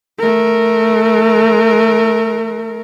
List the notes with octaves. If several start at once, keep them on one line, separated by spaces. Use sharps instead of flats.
A3 A#4